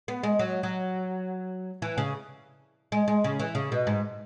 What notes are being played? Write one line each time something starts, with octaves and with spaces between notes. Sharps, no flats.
B3
G#3
F#3
F#3
E3
C#3
G#3
G#3
C#3
E3
C#3
B2
G#2